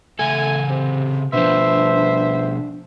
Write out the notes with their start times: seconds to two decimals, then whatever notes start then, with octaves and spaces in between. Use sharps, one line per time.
0.19 C#3 A3 A4 G#5
0.69 C3
1.33 B2 F3 D4 B4 C5 E5